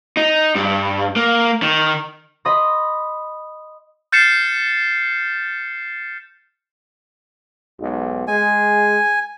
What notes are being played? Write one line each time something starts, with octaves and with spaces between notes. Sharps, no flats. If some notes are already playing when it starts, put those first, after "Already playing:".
D#4
G2
A#3
D#3
D#5 B5 C6 D#6 A#6
F6 G6 A6 C7 C#7 E7
B1 G#2
G#3 G#4 G#5